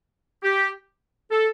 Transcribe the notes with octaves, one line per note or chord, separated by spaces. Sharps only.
G4
A4